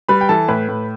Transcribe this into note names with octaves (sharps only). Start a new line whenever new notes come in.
G3 B4 B5
G5
E3 A4 A5
A2 B4 B5
A2